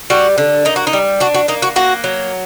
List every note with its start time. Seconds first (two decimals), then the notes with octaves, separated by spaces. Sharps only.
0.10 G3 F#4
0.38 D3
0.65 A#3 D#4
0.76 F#4
0.87 D#4
0.93 G3
1.20 D4 F#4
1.34 F#4
1.48 A#3 D#4
1.62 F#4
1.76 A#3 F#4
2.04 F#3